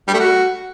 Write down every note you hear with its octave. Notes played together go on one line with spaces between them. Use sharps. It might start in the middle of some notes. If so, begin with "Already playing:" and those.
G3
A3
F#4